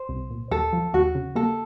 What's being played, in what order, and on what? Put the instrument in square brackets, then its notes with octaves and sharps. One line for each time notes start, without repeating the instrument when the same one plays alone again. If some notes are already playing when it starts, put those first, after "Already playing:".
Already playing: [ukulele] C5
[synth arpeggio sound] C2
A#2
[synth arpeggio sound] D#2 [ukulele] A4
[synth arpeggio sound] F3
[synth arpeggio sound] D#2 [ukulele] F#4
[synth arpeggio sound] C#3
[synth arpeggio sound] A#3 [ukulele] A4